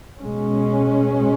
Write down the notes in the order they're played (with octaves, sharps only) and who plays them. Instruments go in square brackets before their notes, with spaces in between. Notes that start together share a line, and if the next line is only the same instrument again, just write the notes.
[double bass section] B2 G#3 C#4